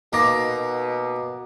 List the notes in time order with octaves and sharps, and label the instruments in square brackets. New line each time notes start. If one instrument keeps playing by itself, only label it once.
[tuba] B2 [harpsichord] A#3 D#4 [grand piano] A#5 D6 A#6